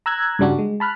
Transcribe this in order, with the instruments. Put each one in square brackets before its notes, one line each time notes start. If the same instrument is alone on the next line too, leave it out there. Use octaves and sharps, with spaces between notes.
[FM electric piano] A#5 E6 F#6 G#6
G2 C#3 G3 D4 F#4
G#3
A5 B5 F6 F#6